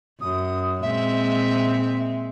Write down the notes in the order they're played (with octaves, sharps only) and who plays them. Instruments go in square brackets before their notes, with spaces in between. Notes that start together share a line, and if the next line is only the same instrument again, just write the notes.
[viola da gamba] F#2 [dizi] D#6
[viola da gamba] A#2 G#3 C4 [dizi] E5